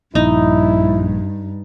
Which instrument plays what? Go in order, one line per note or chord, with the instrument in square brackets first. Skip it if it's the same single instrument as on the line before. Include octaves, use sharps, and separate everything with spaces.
[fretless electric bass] A#1 [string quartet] G2 [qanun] D#4 [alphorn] E4